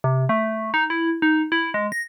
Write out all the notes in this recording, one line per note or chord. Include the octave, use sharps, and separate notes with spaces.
C3
A3
D#4
E4
D#4
E4
G#3
A#6